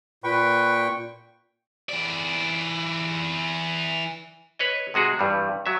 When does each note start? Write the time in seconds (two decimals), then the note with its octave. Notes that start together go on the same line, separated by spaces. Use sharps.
0.24 A#2 B4 G5 C#6
1.89 E3 D5
4.59 B4 C#5 D#5
4.94 C3 G#3 F#4 G#4
5.19 G2 E3 G3
5.66 F#3 E5